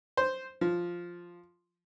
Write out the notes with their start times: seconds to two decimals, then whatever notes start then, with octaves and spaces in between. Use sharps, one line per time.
0.17 C5
0.61 F3